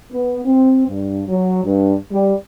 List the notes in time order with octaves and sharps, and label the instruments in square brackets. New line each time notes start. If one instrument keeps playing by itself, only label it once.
[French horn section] B3
C4
G2
F#3
G2
G3